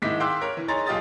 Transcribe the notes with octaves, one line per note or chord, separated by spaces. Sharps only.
G#2 D#3 G#3 E4 D6 B6
F5 G5 C6 D6 E6 F#6
A#4 C#5
E3
D#4 G#4 C#5 A#5 C6 A6
B1 F4 G4 D#5 D#6 A6